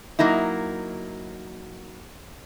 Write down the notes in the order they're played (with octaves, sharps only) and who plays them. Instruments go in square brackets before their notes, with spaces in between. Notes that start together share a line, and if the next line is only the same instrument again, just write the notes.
[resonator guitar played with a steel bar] F#3 A#3 D#4 E4